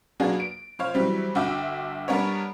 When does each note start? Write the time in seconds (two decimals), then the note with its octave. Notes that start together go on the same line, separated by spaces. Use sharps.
0.20 F#3 A#3 B3 D4 F4 G#4
0.40 D7
0.79 F3 C5 C#5 F5
0.94 E3 F#3 G3 C4
1.35 G1 D3 F#4 E5 G5 D6
2.08 G3 B3 D4 A#4 C#5